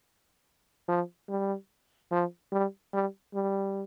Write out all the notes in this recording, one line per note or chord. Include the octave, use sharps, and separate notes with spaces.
F3
G3
F3
G3
G3
G3